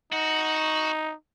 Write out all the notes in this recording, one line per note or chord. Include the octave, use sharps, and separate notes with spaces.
D#4 F#4